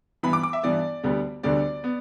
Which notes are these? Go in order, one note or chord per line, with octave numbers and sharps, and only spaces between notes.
G2 E3 B3 B5
D6
D6
E5
G2 E3 B3 D5
D2 D3 G3 B3
D2 D3 G3 B3 D5
B3